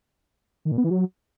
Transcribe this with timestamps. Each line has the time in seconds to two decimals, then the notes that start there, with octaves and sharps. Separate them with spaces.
0.65 D#3
0.72 A#2
0.78 B3
0.84 E3
0.90 F#3